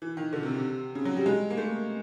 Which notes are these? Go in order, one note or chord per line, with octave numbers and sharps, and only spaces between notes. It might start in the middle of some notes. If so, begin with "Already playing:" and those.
E3
D#3
D3
C3
C3
C#3
F#3
G3
G#3
A#3
A3